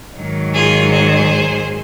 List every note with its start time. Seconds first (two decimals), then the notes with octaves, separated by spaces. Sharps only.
0.16 G#2 D#3 F#3
0.54 F4 G#4
0.92 G#4 C5